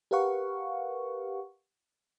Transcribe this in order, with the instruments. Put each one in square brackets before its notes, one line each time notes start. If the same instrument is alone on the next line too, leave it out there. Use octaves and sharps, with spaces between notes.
[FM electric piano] G4 A#4 B4 F5 F#5 C#6